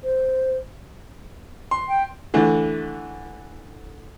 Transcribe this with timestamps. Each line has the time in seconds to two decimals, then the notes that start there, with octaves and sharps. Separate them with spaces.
0.03 C5
1.71 C6
1.88 G5
2.34 D3 E3 A3